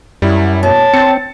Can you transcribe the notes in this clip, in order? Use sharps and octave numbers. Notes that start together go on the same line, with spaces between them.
F#2 G3 E4
B2 C#4 A5
C4 A6 C#7